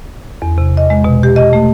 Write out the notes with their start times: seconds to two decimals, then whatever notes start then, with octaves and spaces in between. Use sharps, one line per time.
0.42 E2
0.58 C3
0.77 D#5
0.90 G#3
1.04 B2
1.23 G4
1.36 D#5
1.53 A3